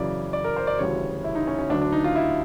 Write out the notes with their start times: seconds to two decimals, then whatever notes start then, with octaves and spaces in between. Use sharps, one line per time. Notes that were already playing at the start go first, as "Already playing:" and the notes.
Already playing: F#2 C#3 E3 D5
0.33 D5
0.44 A#4
0.56 C5
0.67 D5
0.79 D2 C#3 E3 G3 C#5
1.24 E4
1.35 D#4
1.47 C#4
1.58 C#4
1.69 D2 D3 F#3 D4
1.82 D4
1.92 D#4
2.04 F4
2.15 E4